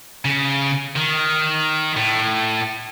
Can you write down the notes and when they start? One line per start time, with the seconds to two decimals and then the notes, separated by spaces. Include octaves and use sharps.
0.25 C#3
0.96 D#3
1.97 A2